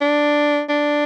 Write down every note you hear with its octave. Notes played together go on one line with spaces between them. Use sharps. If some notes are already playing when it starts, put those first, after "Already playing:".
D4
D4